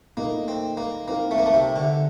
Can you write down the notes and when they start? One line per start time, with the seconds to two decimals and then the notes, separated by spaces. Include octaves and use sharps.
0.17 A#2 A3 A#3 D#4 A#4 D#5
0.48 C4
0.77 A#3
1.08 A#3 C4 D#4 A#4 F5
1.31 A3
1.38 A#3
1.46 A3
1.54 C3
1.76 D3